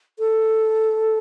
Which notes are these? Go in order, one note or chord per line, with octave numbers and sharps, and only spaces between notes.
A4